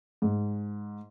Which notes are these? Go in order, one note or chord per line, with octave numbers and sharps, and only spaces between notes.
G#2